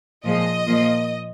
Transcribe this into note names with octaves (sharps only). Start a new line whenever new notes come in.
A#2 F3 G#3 D#5
A#2 F3 A#3